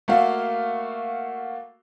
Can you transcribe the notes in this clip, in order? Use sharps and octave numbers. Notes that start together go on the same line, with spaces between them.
A3 A#3 F#4 F5